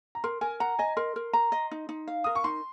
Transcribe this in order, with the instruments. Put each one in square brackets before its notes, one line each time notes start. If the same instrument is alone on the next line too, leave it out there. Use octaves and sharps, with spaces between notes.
[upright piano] A#5
[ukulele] A#4 [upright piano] C6
[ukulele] A#4 [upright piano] G#5
[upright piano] F#5 [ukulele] A#5
[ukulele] D#5 [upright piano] G#5
[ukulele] A#4 [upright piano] C6
[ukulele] A#4
A#5
D#5
D#4
D#4
F5
[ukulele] A#4 [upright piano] D#6
[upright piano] C#6
[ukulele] D#4 [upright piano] C6